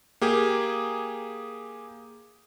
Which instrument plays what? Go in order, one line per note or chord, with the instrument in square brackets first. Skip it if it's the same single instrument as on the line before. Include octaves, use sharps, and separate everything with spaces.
[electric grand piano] A#3 G4 G#4